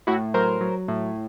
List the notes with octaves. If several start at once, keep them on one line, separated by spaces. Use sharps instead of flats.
A2 E4 F#4
F#3 A#4 C5
F#3
A2